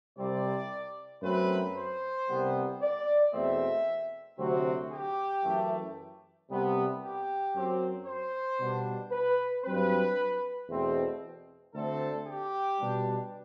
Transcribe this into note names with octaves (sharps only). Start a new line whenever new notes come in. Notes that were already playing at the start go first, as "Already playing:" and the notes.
C2 C3 G3 C4 D5
F#2 F#3 A3 C4 B4
C5
C2 C3 G3 B3
D5
E2 B2 A3 C4 E5
D2 C3 F#3 C4 F#4
G4
F#2 E3 A3
C2 C3 G3 B3
G4
F#2 F#3 C4
C5
B2 G3 B3 D4
B4
G2 F#3 C4 B4
E2 B2 A3 C4
D2 D3 A3 C4 A4
G4
B2 G3 D4